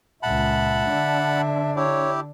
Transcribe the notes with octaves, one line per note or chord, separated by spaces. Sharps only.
C#2 A#2 E5 F#5 A5 B5
D3 D4
E4 G4 C#5